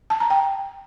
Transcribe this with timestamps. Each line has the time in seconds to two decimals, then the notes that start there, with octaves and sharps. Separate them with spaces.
0.10 A5
0.20 A#5
0.30 G5